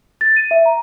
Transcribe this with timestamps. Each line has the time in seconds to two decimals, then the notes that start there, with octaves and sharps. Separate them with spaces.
0.21 A6
0.36 D#7
0.51 E5
0.66 A#5